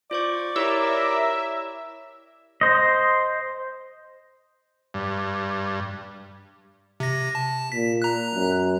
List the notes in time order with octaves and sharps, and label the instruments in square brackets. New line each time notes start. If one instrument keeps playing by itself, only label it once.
[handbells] F4 C5 C#6 [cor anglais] D5
[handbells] E4 G4 C#5 [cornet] A#4 [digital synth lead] E5
[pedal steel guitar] C5 D#5
[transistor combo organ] G2
[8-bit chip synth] C3 A#6
A5
[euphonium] A#2 [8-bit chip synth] B6
[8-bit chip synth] A#5 F#6
[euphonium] F#2